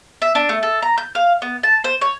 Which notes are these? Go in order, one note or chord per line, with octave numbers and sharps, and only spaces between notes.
E5
D4
A3
A4
A#5
G6
F5
B3
A5
C5
C#5